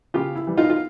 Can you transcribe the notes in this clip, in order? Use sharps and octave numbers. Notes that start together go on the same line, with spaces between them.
C#3 F4 G4
E4
E3 G3
D#4 F4
F4